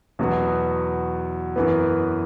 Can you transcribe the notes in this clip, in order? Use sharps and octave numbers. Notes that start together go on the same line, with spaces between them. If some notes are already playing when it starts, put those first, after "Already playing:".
E2 B2 F#3 B3 F#4
F#2 E3 B3